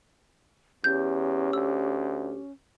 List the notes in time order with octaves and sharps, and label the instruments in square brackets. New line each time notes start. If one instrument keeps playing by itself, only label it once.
[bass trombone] E2 [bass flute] C#4 [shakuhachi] G4 [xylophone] G6
[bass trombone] D2 [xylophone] E6